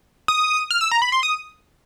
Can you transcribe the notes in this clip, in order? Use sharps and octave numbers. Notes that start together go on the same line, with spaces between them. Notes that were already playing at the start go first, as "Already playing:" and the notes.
D#6
F6
E6
A#5
B5
C6
D#6